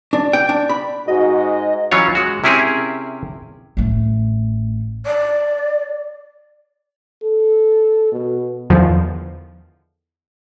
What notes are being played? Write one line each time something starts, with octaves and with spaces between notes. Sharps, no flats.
D4
G5
D4
B5
G#2 F#4 D#5
E3 F#3 C#4 F4 C#5
G#3 F#4
C3 C#4 E4 G4 G#4 A#4
A1 A3
D5
A4
B2
E2 D3 D#3 F3